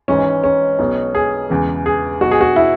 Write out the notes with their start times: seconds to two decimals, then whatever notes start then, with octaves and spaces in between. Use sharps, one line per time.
0.08 G#1 G#2 E3 C#4
0.44 C#4
0.79 B1 B2
1.15 G#4
1.50 E1 E2 C#3 E3
1.86 G#4
2.21 B1 B2 F#4
2.31 G#4
2.41 F#4
2.56 E4